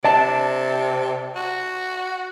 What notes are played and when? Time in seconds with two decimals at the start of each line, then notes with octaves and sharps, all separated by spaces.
0.04 C3 D5 A5
1.36 F#4